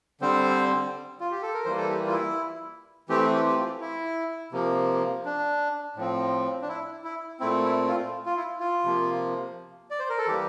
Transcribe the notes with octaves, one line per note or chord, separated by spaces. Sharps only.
D3 G3 C4 C5
F4
G4
A4
A#4
E3 G3 A#3 C5
A4
G4
F4
E4
E3 A3 C4 G4
G4
G4
F4
E4
C3 F3 A#3
D4
A2 F3 C4
D4
E4
E4
A#2 A3 C4 E4
E4
F4
F4
E4
F4
C3 F3 A#3
D5
C5
A#4
A4
E3 G3 A#3 G4